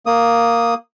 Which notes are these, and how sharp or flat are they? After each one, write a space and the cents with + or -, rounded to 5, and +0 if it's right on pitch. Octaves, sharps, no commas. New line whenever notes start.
A#3 +0 D#6 +0